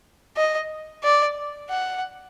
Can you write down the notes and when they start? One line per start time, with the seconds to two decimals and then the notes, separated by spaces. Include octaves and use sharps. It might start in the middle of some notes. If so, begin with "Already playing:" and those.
0.37 D#5
1.03 D5
1.70 F#5